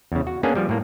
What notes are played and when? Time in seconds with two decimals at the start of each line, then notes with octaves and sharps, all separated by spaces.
0.12 E2 C#3
0.27 F#4
0.43 A#3 B3 C#4 D4 G#4
0.55 F3 G3
0.69 A2 A#3